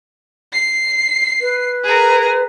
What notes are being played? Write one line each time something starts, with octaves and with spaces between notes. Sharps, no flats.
C7
B4
G#4 A#4